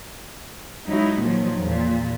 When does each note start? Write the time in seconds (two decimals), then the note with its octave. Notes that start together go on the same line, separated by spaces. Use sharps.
0.85 F#3 G#3 D#4 E4 F#4
1.19 A#2 D#3 F3 F#3
1.61 E2 A#2